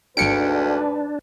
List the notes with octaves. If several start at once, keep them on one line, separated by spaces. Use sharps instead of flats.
G#1 D2 G#2 D4 B4 C#7 D7